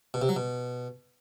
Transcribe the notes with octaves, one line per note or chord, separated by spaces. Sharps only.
B2
C3
F#3
B2